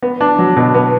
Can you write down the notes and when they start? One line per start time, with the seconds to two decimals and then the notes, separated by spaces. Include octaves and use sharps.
0.02 B3
0.21 D4
0.39 F#3
0.56 B2
0.74 B3